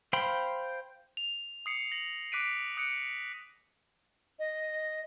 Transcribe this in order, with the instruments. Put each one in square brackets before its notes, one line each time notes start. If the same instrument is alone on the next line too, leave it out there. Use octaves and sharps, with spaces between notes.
[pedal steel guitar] C5 F5 G5 B5 C6
[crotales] F7
D#6 C7 C#7
A#6 F#7
D6 F#6 B6 C7 D7 D#7
D#6 F#6 C#7 D7
[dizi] D#5